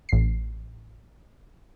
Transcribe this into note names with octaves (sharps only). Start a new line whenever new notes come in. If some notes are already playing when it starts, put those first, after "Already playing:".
A1 C7